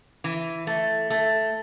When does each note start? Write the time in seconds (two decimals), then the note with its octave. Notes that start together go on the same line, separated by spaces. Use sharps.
0.24 E3
0.67 A3
1.10 A3